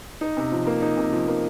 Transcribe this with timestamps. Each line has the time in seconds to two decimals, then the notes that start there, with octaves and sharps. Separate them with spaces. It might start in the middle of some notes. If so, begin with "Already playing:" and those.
0.21 D#4
0.37 C3
0.52 F3
0.67 A#3
0.82 D#4
0.97 C3
1.13 F3
1.28 A#3